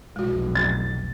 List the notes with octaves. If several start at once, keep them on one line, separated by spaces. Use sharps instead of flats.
F1 B1 E2 G#3 F#4
A6